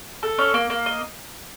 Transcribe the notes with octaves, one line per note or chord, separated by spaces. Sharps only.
A4
C#4
A#3
A#3
D#5